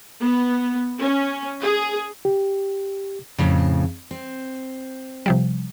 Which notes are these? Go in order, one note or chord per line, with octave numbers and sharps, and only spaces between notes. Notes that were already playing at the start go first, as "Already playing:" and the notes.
B3
C#4
G#4
G4
F2 A2 C#3
C4
C3 F3 G3